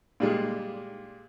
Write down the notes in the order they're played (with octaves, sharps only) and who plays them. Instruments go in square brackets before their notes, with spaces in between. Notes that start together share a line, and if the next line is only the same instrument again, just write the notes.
[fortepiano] A#2 G3 G#3